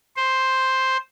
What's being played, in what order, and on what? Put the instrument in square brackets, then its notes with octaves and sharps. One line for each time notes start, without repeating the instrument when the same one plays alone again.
[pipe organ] C5